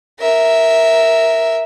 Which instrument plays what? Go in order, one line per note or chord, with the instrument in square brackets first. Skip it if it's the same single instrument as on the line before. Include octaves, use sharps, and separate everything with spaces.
[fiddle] A#4 E5